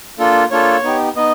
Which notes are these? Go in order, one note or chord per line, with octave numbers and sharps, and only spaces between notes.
A#3 D4 F4 A4
A#3 D4 F4 A4 C#5
B3 D#4 G4
B3 D#4 D#5